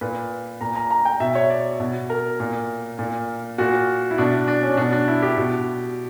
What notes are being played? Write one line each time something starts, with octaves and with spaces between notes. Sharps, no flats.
A#2 B4
A#2 A#5
A#5
A#5
G5
B2 E5
C#5
D5
B2
A#4
A#2
A#2
A#2 F#4
E4
B2 D4
D4
C#4
B2 D4
D4
E4
G4
B2